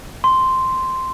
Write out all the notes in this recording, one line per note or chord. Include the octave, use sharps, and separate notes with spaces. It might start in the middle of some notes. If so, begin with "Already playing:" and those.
C6